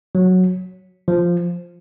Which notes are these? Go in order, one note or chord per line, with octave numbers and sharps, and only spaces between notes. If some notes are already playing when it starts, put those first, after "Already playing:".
F#3
F3